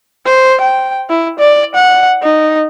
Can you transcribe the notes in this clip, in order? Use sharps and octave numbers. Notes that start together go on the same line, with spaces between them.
C5
G5
E4
D5
F#5
D#4